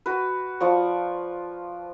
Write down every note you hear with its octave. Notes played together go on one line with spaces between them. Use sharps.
F#4 B4
F3 D5 C#6